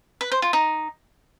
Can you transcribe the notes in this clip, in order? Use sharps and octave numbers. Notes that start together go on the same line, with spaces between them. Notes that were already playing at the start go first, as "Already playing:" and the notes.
B4
C5
F4
D#4